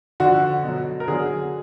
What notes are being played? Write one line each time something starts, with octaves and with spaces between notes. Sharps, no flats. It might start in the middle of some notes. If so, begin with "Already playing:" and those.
D3 F3 F#4
B2 F#3
A#4
D3 F#3 G#4